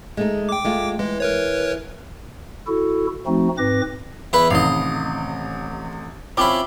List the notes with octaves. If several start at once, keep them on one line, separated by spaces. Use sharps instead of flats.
G#3 A3 D#4
G5 D6
G#3 A3 F4
E3 G#3
A#4 B4 C#5
E4 F#4 A4
F3 A3 C4 D#4 F#4
G#2 C4 B4 D6 A#6
E2 E4 B4
A1 C3 D#3 D#5 F5
C4 C#4 E4 F4 B5 D6